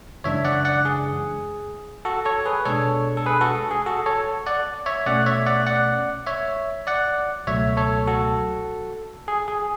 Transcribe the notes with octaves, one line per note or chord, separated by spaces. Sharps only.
F#2 C#3 E3 G#3 D4 C#5 E5
D5 F#5
D5 F#5
G#4
F#4 A4
A4 C#5
G#4 B4
B2 G#3 D4 A4 C#5
A4
G#4 B4
F#4 A4
G#4
F#4 A4
A4 C#5
D5 F#5
C#5 E5
B2 A3 C#4 D5 F#5
C#5 E5
D5 F#5
D5 F#5
C#5 E5
D5 F#5
C#2 B2 F#3 A3 C#5 E5
A4 C#5
F#4 A4
G#4
G#4